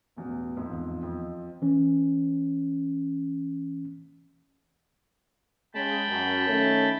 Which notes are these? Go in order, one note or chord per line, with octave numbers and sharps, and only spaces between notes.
A1 E2 B2
A#1 F2 G#2
E2
F2 C4 D#5
E3 C#4
C#3 G#3 G5 A5 B5
F#2
D#3 A3 C#4